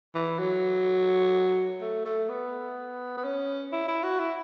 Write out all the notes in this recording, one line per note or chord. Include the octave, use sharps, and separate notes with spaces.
E3
F#3
A3
A3
B3
B3
C#4
E4
E4
F#4
E4